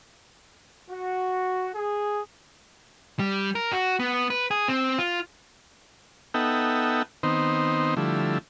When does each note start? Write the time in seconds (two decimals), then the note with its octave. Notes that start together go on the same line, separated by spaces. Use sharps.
0.89 F#4
1.75 G#4
3.19 G3
3.55 A#4
3.73 F#4
4.00 B3
4.30 B4
4.51 G#4
4.68 C4
4.98 F4
6.34 B3 D#4 A4 E5 F#5 G5
7.23 D#3 B3 C4 D#4 C5
7.97 D3 F3 G3 A3 E4